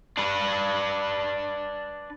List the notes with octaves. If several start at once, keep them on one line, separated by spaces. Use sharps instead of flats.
D4 B4